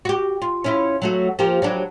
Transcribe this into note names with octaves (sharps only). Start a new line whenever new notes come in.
F#4 G4
F4
C#4 E4 F4
F#3 A3 F#4
F3 A#3 G4
F#3 G3 D4